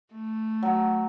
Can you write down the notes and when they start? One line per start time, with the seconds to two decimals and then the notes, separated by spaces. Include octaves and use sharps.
0.12 A3
0.63 F#3